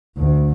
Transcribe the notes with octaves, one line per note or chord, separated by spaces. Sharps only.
D2